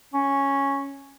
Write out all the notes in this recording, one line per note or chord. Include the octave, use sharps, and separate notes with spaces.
C#4